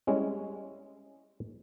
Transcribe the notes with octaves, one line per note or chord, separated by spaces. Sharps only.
G3 G#3 C#4 E4